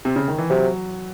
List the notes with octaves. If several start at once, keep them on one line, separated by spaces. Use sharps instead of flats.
C3
C#3
D#3
E3
C3 F#3